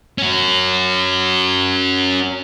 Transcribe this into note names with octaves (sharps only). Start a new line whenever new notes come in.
C#4 F#4